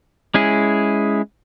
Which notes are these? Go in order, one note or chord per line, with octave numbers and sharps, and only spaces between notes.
G#3 C#4 E4 G#4